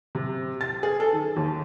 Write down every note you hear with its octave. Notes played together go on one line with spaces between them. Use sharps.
C3
A6
G#4
A4
D#3
D#2